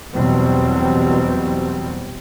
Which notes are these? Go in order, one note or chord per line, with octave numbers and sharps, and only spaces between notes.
E2 B2 F#3 G3 C4